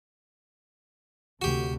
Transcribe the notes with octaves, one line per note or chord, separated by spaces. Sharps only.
D2 C3 F#4 G4